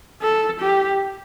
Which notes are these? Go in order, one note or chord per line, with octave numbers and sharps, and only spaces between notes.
A4
G4